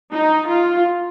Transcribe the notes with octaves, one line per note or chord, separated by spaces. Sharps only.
D#4
F4